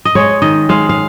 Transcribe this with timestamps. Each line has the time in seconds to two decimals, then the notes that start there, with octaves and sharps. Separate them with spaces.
0.05 D#5
0.15 G#3 C#5
0.42 D#3 D#5
0.69 G#3 F5
0.89 F5